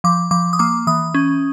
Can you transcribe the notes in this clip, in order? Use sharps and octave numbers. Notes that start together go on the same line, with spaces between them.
F3 D6
F3 D6
D#6
A#3 D6
E3 D#6
C#4